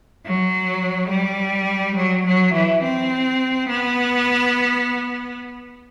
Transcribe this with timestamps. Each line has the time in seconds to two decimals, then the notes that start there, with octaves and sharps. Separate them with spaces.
0.25 F#3
1.11 G3
1.96 F#3
2.25 F#3
2.54 E3
2.82 C4
3.68 B3